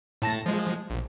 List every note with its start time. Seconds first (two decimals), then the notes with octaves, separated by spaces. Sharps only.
0.22 A2 A5 A#6
0.46 F3 G#3
0.90 A#1